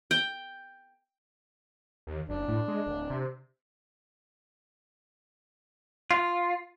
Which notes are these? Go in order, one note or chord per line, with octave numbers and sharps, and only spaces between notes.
G5
D#2
F#1 D4
A2
G#3
D1
C3
F4